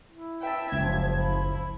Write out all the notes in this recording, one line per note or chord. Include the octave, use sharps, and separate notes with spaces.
E4
B4 E5 G5 A5
F#1 C#2 F#2 F3 G#6
E4